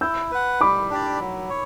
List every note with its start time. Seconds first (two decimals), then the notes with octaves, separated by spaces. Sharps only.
0.01 E4 E6 G6
0.31 B4 F#5
0.61 G3 B5 D6
0.90 D4 G4 D5
1.20 F#3
1.50 C#5